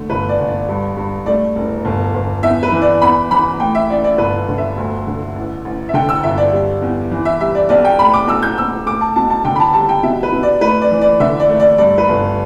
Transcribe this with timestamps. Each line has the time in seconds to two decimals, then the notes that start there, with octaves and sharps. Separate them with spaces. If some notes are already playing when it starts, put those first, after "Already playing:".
Already playing: D3 A3
0.10 G1 B4
0.29 D5
0.39 G1
0.48 D5
0.68 G2
0.97 G2
1.26 A3 D5
1.56 E1
1.85 G1
2.14 G1
2.43 E2 E5
2.63 B4
2.72 E3
2.82 D5
3.02 E2 B5
3.31 E3 B5
3.60 A2 G5
3.75 E5
3.90 A1 D5
4.04 D5
4.18 G1 B4
4.48 D3
4.58 E5
4.77 D2
5.07 D3
5.36 A1
5.65 A1
5.89 E5
5.94 D3 G5
6.09 E6
6.23 G1 E5
6.38 D5
6.52 G3
6.82 E2
7.12 E3
7.25 E5
7.40 G3 E5
7.55 D5
7.69 B1 D5
7.85 G5
7.99 A2 B5
8.14 D6
8.28 B1 E6
8.42 G6
8.57 B1 E6
8.86 A3 D6
9.01 A5
9.16 B2 A5
9.30 A5
9.45 D3 G5
9.56 B5
9.60 A5
9.74 G3 A5
9.89 G5
10.03 B2 E5
10.23 B4
10.32 B2
10.43 D5
10.61 A3 B4
10.82 D5
10.91 E3
11.01 D5
11.20 D3 E5
11.40 D5
11.49 A3
11.60 D5
11.78 G2 D5
11.98 B4
12.09 G1